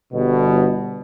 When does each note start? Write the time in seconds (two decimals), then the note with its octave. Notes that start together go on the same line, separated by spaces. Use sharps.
0.13 G1 B2